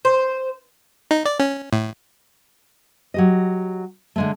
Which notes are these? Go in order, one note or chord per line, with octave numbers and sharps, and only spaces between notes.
C5
D#4
D5
C#4
A2
F#3 G4 D#5
D3 G#3 A3